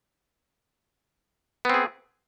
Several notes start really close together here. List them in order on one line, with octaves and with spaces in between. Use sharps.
B3 C4 G#4